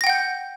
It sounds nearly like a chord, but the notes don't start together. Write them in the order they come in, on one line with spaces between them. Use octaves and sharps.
A#6 G5 F#5 G6